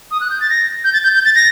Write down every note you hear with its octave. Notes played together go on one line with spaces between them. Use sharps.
D#6
F#6
G6
A6
A#6
G6
A6
G6
G6
A6
A#6